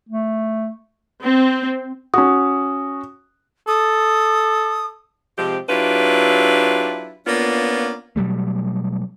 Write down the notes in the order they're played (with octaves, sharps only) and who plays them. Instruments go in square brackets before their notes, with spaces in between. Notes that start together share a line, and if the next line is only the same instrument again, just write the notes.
[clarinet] A3
[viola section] C4
[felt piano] C#4 F#4 [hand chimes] D#6
[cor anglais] A4 [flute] D#6
[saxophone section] C3 F3 G#3 C4 G4
F#3 D4 E4 F4 G4 B4
A#3 B3 C#4 D4 F4
[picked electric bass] B2 F#3 G3 A3